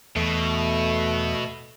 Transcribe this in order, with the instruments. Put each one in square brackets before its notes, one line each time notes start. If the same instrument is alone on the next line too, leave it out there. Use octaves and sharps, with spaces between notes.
[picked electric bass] E2 [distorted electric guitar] B2 [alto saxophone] A3